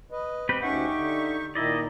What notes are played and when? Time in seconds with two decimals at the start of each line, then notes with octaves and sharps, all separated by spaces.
0.12 B4 D#5
0.49 C4 G4 B4
0.62 D2 C#4 D#4 G4 E5 F#5 C#6
0.94 D3
1.55 A#2 D#3 D#4 E4 D5 D#5